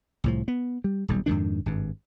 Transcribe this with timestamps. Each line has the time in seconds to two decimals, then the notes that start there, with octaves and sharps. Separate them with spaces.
0.24 C2 A2 F3
0.48 B3
0.84 G3
1.08 D#1 B1 G3
1.26 F2 G#2 D#3 D4
1.66 G#1 G2